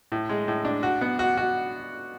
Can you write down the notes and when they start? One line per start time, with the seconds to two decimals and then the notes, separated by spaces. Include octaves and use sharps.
0.12 A2
0.29 G#3
0.48 A2
0.65 D4
0.83 F#4
1.01 B3
1.19 F#4
1.37 F#4